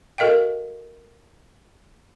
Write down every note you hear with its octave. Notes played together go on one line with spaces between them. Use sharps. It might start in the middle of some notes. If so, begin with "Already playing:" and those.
F#4 A4 A#4 D#5 F5 G5